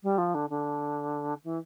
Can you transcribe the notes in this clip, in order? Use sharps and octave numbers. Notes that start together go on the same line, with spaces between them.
G3
F3
D3
D3
E3